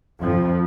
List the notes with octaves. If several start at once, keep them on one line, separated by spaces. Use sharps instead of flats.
F2 F3